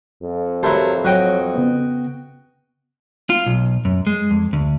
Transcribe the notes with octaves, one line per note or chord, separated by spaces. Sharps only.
F2
F#3 E4 G4 A#4 C5 A5
F#3 F#4 C#5 D#5 G5
C#3 B3
F4
B1
F#2
G#3
F2
D2